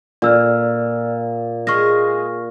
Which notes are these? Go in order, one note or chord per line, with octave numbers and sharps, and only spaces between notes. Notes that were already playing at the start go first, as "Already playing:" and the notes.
A#2 D5 E6 F6
G#3 G#4 C#6 F6 A#6